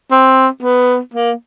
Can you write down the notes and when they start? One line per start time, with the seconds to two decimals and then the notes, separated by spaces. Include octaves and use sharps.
0.12 C4
0.63 B3
1.14 A#3